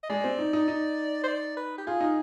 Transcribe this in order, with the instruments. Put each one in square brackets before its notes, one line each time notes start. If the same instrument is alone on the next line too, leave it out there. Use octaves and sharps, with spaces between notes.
[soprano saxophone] D#5
[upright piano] G#3 [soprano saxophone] D5
[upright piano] C4
D#4
D#4
D#4
[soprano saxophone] C5
D5
B4
G4
[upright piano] F4 [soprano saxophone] G#4
[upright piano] D#4